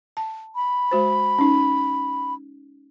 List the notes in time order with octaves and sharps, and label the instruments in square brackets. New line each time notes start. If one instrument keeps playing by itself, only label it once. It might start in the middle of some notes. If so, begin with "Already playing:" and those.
[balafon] A5
[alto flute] B5
[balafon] G#3 F#4 C5
C#4 D#4